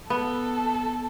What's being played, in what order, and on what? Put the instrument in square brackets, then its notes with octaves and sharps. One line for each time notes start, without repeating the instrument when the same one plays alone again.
[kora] B3 [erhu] A4